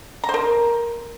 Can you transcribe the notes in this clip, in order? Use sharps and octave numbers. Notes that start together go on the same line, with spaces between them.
A#5
C5
A#4